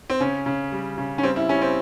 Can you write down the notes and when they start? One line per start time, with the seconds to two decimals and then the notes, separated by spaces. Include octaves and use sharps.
0.10 C4
0.20 C#3 C#4
0.46 C#3
0.72 G3
0.98 C#3
1.18 C#4
1.23 G3 C4
1.36 E4
1.49 G3 C#4
1.62 C4